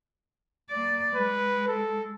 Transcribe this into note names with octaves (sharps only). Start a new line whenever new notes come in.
A#3 D5
G#3 B4
A4